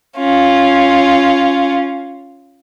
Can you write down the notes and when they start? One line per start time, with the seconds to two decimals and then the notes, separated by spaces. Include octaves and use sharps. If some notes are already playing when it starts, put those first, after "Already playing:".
0.18 C#4 F4